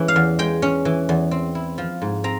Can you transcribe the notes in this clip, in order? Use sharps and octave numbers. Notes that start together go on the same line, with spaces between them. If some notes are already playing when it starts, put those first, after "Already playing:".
Already playing: E3 G#3 C#4
F5
E2
G#3 G5
C#4
E3
E2
C4
E4
F3
G#2
C4 A#5